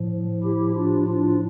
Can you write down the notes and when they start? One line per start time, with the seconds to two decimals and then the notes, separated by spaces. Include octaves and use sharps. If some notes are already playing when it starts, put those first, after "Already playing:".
Already playing: A2 F3
0.43 E4 G4
0.76 D4 F4
1.08 D4 F4